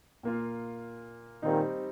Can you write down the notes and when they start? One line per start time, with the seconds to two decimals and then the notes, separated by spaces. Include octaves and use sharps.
0.23 A#2 A#3 F4
1.43 A#2 D#3 G3 C4 D#4